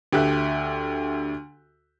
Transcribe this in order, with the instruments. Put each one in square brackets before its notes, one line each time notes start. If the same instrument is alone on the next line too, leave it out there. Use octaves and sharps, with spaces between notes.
[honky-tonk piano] D2 G4 E5 F#6